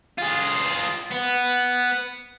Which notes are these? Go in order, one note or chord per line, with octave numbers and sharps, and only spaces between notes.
F4 G#4
B3